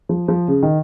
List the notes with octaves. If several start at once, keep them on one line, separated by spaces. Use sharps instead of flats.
F3
F3
C#3
D#3